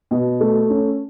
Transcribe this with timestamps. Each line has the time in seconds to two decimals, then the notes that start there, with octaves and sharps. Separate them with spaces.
0.11 B2
0.40 A3
0.70 C#4